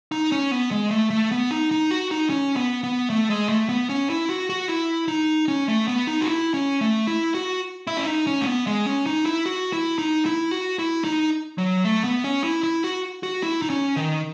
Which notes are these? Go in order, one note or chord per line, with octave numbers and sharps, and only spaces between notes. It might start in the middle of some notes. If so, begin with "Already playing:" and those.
D#4
C#4
B3
G#3
A3
A3
B3
D#4
D#4
F#4
D#4
C#4
B3
B3
A3
G#3
A3
B3
C#4
E4
F#4
F#4
E4
D#4
C#4
A3
B3
D#4
F#4
E4
C#4
A3
E4
F#4
E4
C#4
D#4
C#4
A3
B3
G#3
C#4
D#4
E4
F#4
E4
D#4
E4
F#4
E4
D#4
F#3
A3
B3
C#4
E4
E4
F#4
F#4
E4
D#4
C#4
D#3